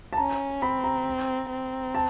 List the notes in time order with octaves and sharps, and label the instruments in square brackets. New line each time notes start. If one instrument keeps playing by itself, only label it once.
[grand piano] A5
[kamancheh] C#4 [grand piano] A#5
[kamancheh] C4 [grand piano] B5
[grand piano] A#5
[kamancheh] C4
[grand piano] A5